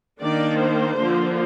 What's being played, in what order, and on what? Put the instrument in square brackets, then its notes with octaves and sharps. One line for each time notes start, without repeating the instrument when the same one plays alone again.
[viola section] D#3 A#3 D4 D5
C5
D3 F3 A#3 D4